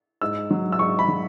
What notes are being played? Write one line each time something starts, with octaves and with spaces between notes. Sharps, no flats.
G#2 E6
F#3
E6
G#2 C#6
B5
F#3